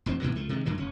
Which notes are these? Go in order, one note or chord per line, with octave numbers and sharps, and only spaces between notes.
E1 F2 E3 C4
A2 C3 E3 B3
C#2 F3 A3
C3 D#3 G3 G#3
F#2 D3 D#3 F#3
F1 C#4